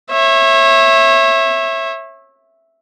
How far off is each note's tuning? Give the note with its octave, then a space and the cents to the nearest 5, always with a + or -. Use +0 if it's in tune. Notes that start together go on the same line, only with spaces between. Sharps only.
C#5 -30 E5 +0